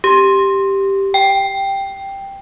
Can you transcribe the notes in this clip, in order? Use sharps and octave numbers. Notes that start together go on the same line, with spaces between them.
G4
G5